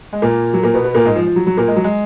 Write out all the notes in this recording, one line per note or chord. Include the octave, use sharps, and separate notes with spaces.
G#3
A#2 A#3
F#3
A#2 A#3
B2 B3
B2 B3
A#2 A#3
G#2 G#3
F3
F3
F#3
F#3
A#2 A#3
G#3
F#3
G#3